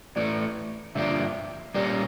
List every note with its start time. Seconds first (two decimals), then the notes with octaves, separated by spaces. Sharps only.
0.16 A2 E3 A3 D5
0.95 G2 D3 F3 A#3 D4 E5
1.74 A#2 G3 A#3 C#4 G4 D5